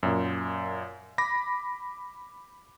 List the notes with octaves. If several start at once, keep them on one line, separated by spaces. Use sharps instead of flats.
F#2 A#2
B5 D6 A#6